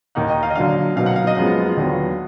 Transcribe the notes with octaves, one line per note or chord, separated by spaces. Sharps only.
D#2 D#3 A#3 D#4 F#5
D#5
F5
D#5
D3 F#3 D4 F5
B2 F#3 A#3 D#4 F5
F#5
F5
D#5
F#2 F3 G#3 B3 F4
D#2 D3 F#3 B3